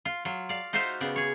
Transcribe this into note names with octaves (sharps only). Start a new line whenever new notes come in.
F4
F#3 F4
D5 F5
D#4 F4 F#4 C5 E5 F5
C#3 B3 D5
G#4 C#5